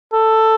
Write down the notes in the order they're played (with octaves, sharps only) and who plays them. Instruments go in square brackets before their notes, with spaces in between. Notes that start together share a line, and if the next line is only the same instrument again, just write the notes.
[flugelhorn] A4